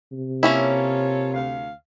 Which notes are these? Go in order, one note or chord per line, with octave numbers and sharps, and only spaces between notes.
C3
A#3 C#4 E4 F4 A4 C#5
D2 F5